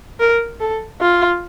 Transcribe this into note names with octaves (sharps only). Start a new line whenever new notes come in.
A#4
A4
F4